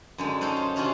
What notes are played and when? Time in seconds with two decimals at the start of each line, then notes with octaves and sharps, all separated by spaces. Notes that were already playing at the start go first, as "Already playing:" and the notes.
0.18 F#2 D3 G#3
0.41 C#4 D#4 A4 C5 F#5
0.56 F4
0.76 C3 C#4 D4 F4 F#4 F5